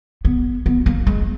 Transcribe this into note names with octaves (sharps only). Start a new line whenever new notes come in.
B3
B3
A#3
G#3